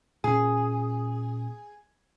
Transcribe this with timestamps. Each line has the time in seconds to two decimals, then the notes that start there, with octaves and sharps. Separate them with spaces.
0.24 A#2 C#4 G#4